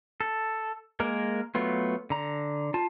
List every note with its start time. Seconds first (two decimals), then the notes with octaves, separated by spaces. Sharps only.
0.21 A4
1.00 G#3 A#3 A#4
1.55 F#3 A3 B3 F4
2.10 D3 A#5
2.74 F4 A5